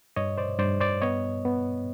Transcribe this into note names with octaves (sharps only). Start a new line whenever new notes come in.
G2 C#5 D#5
C5 D5
G2 C5 D5
C5 D5
B3 C#5 D#5
B3